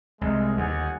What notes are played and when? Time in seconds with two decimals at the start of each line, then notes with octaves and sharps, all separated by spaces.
0.21 C2 G#3
0.57 G1 D#2 F#5 G#5